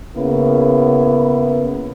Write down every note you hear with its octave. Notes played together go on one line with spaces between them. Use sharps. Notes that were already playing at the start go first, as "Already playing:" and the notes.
C#3 A#3 B3 E4